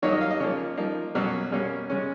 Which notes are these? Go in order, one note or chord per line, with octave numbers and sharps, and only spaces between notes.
D#3 F#3 A#3 D#4 C#5
D#5
F5
D#5
C#3 F3 A#3 C#5
F3 A#3 D#4
B2 F#3 A#3 C#4
B2 A#3 C#4
C#3 G#3 C#4